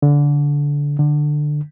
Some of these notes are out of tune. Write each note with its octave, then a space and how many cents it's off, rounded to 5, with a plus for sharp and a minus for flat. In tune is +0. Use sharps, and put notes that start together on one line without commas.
D3 -20
D3 +15